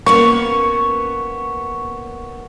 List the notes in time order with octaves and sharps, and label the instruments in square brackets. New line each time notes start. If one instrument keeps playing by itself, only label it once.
[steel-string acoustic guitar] A#3 B3 C#4 [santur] C#6